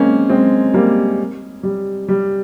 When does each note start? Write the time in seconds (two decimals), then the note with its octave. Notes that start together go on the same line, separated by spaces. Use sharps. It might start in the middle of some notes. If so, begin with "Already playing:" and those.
Already playing: G#3 A#3 C4 C#4
0.30 G#3 C4
0.74 G3 A#3
1.63 G3
2.09 G3